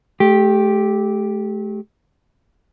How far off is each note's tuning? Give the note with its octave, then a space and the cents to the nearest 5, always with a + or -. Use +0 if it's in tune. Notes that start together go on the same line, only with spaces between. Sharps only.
A3 -35 G4 +0